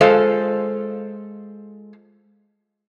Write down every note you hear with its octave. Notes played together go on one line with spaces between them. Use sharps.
G#3 F4 A4 C5 F5